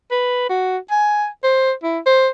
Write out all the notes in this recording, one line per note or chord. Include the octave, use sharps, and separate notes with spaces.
B4
F#4
G#5
C5
E4
C5